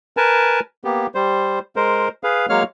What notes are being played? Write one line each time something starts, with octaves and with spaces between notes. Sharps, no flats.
A#4 B4 G#5 A5
A#3 B3 G4
G3 C5
G#3 A#4 C5
G#4 B4 F5
F#3 G#3 A#3 C#5 F5 F6